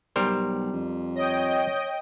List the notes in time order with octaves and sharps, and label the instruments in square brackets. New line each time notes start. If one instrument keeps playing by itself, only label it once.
[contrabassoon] B1 [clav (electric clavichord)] G3 A#4 C5
[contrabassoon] F2
[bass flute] C#5 [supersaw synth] D#5 G5